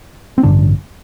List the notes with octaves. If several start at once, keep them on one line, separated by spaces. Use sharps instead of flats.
C4
A1 G2 D3 D4